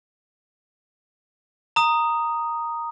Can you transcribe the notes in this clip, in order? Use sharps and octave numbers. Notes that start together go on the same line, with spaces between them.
A#5 D#6